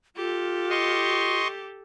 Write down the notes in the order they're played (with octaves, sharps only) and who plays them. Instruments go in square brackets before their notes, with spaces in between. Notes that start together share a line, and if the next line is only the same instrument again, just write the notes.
[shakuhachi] F4 [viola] G4 A4
[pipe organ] D#5 C6 C#6